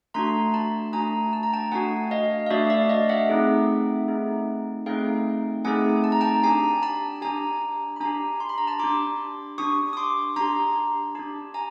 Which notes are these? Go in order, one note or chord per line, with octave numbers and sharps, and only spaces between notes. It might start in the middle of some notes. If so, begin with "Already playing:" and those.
A3 D4 F#4 A#5 C6
A5 B5
A3 D4 F#4 G#5 A#5
A5
A#5
G5 A5
A3 D4 F#4 F#5 G#5
D#5 F5
F5
A3 D4 F#4 D5 E5
D5 E5
D#5 F5
E5 F#5
A3 C4 D#4 G#4
A3 C4 D#4 G#4
A3 C4 D#4 G#4 F5 G5
A3 C4 D#4 G#4 F#5 G#5
A5
A#5
G5 A5
D4 G4 G#5 A#5
A5 B5
D4 G4 G#5 A#5
B5
D4 G4 G#5 A#5
C6
B5
A#5
A5 B5
D4 G4 C6 D6
D4 G4 C#6 D#6
D#6
C6 D6
D4 G4 A#5 C6
D4 G4 A5 B5
G#5 A#5